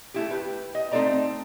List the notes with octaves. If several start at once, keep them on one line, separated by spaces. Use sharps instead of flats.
A3 E4 G4
G4 B4
D#5
A3 C4 D#4 A4 D5 A#5